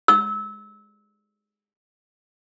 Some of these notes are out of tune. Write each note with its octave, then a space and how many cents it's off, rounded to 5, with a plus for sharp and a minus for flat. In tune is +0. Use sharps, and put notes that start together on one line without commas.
E6 -25